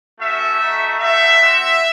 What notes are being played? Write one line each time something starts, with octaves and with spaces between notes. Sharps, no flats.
A3 C#4 F#4 E5
A3 D#4 F#4
A3 D#4 F#4 E5
C4 F#4